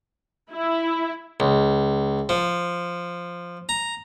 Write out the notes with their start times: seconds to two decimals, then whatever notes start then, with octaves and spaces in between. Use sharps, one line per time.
0.51 E4
1.40 C#2
2.29 F3
3.69 A#5